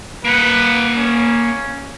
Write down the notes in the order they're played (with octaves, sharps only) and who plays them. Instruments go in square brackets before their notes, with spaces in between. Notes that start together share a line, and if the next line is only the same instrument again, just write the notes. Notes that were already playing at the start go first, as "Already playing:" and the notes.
[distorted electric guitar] A#3 F#5 [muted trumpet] B4
[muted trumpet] C#4